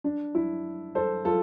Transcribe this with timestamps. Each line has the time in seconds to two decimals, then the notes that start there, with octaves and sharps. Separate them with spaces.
0.04 D4
0.35 E4
0.95 A4 C5
1.25 F4 A4